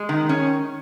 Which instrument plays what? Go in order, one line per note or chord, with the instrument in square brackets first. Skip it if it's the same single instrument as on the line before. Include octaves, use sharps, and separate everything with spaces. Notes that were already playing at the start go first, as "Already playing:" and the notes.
Already playing: [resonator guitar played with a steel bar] G#3
D#3
C#4